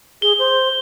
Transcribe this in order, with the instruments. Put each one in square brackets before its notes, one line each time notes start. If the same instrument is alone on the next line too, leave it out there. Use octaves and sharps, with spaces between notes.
[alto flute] G#4 [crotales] G7
[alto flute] C5